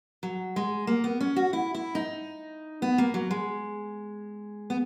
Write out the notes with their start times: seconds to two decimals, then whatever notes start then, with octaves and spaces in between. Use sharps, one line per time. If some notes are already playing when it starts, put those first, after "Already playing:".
0.23 F#3
0.56 G#3
0.87 A#3
1.04 B3
1.21 C#4
1.36 F#4
1.53 E4
1.74 E4
1.95 D#4
2.82 B3
2.98 A#3
3.14 F#3
3.31 G#3
4.70 B3